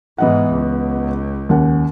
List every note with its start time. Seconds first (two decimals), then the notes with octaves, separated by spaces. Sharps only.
0.18 G#2 E3 B3 D#5 F#5
0.51 C#2
1.49 D#2 C#4 F#5